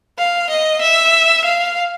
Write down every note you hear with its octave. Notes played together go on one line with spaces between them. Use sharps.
F5
D#5
E5
F5